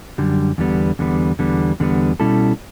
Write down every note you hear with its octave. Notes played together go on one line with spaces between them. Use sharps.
F#2 D3 G3
E2 D3 G3 B3
E2 D3 G3 B3
E2 D3 G3 B3
E2 D3 G3 B3
B2 G3 C#4 E4 A4